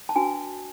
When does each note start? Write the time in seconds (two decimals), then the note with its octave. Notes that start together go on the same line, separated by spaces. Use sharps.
0.09 A5
0.16 D4 F#4 B4 G#5